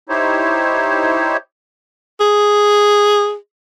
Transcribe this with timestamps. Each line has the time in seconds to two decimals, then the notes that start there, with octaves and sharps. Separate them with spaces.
0.09 D#4 E4 G4 C5 C#5
2.20 G#4